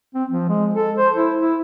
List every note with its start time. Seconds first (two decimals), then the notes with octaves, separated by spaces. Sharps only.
0.15 C4
0.30 F3
0.49 G#3
0.74 A4
0.98 C5
1.15 E4
1.39 E4